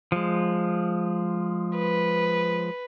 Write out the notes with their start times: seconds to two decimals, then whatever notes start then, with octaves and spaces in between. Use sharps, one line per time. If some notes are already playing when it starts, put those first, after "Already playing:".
0.12 F3 G#3
1.76 B4